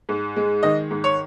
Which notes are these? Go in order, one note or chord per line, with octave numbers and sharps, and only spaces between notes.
G#2
G#3
D#3 D#5
G#2
C#5